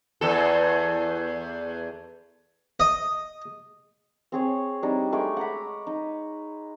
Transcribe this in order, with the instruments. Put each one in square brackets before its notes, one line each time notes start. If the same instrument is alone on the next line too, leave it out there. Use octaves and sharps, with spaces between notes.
[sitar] E2 A4
[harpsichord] D#5
[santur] C4 G#4 C#5
G3 C4 D4 D#4
G#3 A3 C#6 D6
F#5 A#5 B5
D#4